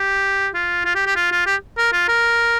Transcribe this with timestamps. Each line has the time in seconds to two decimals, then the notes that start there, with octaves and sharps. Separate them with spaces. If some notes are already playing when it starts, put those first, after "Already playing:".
Already playing: G4
0.54 F4
0.85 F4
0.95 G4
1.06 G4
1.16 F4
1.32 F4
1.46 G4
1.77 A#4
1.93 F4
2.08 A#4